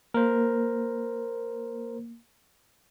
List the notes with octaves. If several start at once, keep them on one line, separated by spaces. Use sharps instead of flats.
A#3 A#4 C5